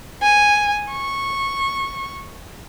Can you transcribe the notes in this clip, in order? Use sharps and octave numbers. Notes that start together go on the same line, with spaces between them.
G#5
C#6